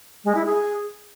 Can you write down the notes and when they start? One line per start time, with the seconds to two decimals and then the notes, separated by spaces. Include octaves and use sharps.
0.25 G#3
0.35 E4
0.45 G#4